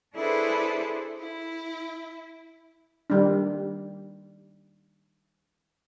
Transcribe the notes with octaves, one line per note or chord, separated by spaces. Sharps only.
D4 E4 G#4 A4 B4 C5
E4
D#3 G3 D4